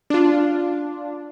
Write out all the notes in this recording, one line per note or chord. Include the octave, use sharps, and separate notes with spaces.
D4 F4